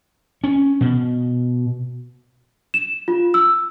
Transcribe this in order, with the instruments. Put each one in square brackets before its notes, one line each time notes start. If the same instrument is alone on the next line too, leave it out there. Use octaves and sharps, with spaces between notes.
[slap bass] C#4
B2
[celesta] E7
F4
E6